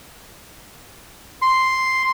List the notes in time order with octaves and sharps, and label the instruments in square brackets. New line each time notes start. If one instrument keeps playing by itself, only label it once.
[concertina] C6